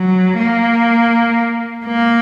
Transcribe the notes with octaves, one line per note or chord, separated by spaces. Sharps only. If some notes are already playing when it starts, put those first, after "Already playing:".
Already playing: F#3
A#3
A#3